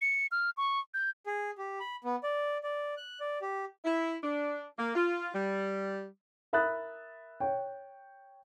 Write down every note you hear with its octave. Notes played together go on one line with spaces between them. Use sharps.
C#7
F6
C#6
G6
G#4
G4
B5
B3
D5
D5
F#6
D5
G4
E4
D4
A#3
F4
G3
A#4 E5 B5 D#6 F#6 A6
C#5 G5